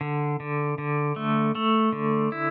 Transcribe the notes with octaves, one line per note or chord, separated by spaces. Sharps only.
D3
D3
D3
A3
A3
D3
E4